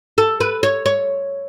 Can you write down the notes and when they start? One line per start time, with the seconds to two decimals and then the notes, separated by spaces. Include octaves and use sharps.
0.18 A4
0.40 B4
0.63 C#5
0.86 C#5